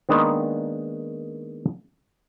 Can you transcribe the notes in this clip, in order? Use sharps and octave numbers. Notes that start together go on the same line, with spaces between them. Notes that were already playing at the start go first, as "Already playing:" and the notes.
D#3 G#3 A#3 B3 D4 D#4